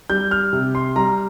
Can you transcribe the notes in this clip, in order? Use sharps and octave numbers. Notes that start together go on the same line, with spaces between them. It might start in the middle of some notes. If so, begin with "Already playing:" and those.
G3 G6
F6
C3
C6
G3 A#5